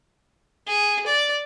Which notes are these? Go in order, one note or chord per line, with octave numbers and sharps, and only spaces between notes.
G#4
D5